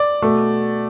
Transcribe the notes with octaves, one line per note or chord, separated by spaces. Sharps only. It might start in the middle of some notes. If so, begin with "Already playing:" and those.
Already playing: D5
B2 A3